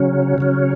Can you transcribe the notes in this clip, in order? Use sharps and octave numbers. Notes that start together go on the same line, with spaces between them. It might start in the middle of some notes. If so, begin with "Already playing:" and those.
Already playing: C#3 F#3 C#4
C#3 F#3 C#4